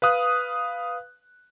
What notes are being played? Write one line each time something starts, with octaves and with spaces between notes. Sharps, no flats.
B4 F5 D#6 F#6